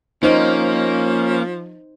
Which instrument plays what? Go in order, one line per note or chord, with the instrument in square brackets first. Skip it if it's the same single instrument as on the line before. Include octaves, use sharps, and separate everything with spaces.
[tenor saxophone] F3 [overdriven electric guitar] A#3 [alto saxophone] C#4 [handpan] D#4 C5